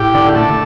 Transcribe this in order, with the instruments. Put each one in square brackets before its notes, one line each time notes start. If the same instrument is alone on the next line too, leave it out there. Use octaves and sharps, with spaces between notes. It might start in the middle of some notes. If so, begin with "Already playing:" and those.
Already playing: [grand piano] A2 [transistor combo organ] G4
[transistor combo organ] D3
[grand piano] A2
[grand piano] A#2 [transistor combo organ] A3